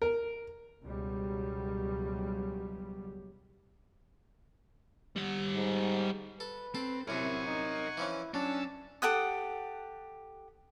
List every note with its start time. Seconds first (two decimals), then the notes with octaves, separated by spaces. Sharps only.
0.02 A#4
0.83 C#2 B2 F#3 G3
5.16 G3 F#5
5.55 G#2
6.40 A4 B4
6.75 C4 A4
7.08 F#2 C3 E4 A#4 E5 F#5 G#5 C#6
7.46 D#4
7.97 E3 F3 C#4 E4
8.34 F#3 C#4 D4 A5 E6
9.02 G4 A4 F#5 D#6